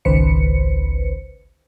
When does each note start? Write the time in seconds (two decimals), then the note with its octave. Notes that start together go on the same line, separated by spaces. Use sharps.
0.05 G#1 C#2 D#3 B4 C5 C#7